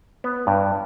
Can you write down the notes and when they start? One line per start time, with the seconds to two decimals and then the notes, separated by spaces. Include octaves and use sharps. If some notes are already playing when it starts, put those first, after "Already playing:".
0.24 B3
0.47 G2